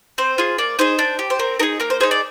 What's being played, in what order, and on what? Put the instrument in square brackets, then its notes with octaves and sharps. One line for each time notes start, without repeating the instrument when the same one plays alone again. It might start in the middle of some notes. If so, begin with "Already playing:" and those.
[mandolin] C4 C5
F4 G#4
A#3 D5
D#4 G#4 C5
D4
G4
C5
C4 A#4
D#4 G#4 A#4
A#3 A#4
C5
D#4 G#4 C5
D5